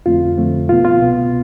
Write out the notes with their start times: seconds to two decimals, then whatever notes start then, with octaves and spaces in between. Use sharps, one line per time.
0.06 F2 D3 F3 A3 C4 F4
0.37 F2 D3 F3 A3 C4
0.69 C2 B2 B3 F4
0.85 F4
1.01 C2 B2 B3